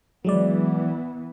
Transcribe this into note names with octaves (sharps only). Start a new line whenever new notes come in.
E3 F#3 G#3 B3 D5